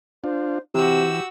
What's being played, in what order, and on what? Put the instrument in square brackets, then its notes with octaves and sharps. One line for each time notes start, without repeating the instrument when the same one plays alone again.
[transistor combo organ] D4 F4 [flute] C5
[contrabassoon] C3 [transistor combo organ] E3 [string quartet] F#4 E6 [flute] G4